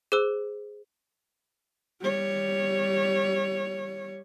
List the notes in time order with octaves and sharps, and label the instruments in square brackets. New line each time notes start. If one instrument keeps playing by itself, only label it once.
[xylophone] G#4 C5 E6
[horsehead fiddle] G3 C#5